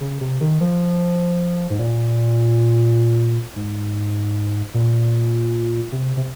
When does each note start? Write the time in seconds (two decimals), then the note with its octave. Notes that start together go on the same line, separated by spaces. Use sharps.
0.01 C#3
0.21 C3
0.41 D#3
0.61 F3
1.70 G#2
1.79 A#2
3.56 G#2
4.74 A#2
5.92 C3
6.17 C3